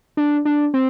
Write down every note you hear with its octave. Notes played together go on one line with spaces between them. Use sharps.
D4
D4
C4